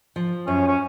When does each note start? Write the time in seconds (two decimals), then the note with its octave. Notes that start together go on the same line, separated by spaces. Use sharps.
0.16 F3
0.47 F#2 C#4
0.68 C#4